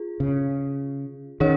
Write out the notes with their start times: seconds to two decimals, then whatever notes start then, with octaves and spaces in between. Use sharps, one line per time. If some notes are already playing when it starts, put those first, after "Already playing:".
Already playing: F4 G#4
0.20 C#3
1.40 D#3 C#4 G#4 C#5